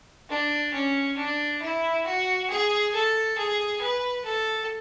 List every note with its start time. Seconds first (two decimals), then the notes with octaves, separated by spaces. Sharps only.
0.29 D4
0.73 C#4
1.17 D4
1.62 E4
2.06 F#4
2.50 G#4
2.94 A4
3.38 G#4
3.81 B4
4.25 A4